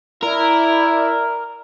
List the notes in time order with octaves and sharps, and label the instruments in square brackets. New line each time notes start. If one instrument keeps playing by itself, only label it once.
[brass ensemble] E4 [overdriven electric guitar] A#4 [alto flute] D5